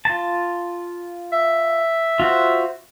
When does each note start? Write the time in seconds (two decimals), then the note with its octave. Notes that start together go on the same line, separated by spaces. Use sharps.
0.05 F4 A5
1.32 E5
2.20 F4 F#4 C5